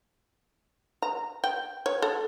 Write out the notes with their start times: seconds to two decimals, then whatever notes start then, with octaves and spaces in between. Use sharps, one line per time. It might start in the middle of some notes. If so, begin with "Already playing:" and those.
1.02 A#5
1.44 G5
1.86 C#5
2.02 A4